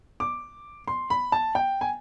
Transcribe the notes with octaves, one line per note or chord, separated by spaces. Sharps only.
D6
C6
B5
A5
G5
G#5